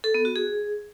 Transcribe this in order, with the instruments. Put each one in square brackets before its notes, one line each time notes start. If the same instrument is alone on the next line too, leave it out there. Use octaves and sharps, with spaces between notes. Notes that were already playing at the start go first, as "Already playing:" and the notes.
[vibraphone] A4
B3
F#4
G#4